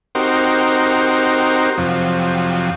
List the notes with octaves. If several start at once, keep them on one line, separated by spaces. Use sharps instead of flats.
C4 D#4 F#4 G4 A#4 C5
F2 C3 F3 F#3